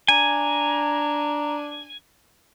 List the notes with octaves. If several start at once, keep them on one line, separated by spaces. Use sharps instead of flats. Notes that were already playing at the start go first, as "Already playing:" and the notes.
D4 G#5 A#5